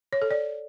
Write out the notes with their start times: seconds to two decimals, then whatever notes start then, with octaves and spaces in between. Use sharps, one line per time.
0.13 C#5
0.22 A4
0.31 D5